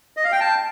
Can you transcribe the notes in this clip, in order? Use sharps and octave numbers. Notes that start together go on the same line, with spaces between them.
D#5
F5
G5
A5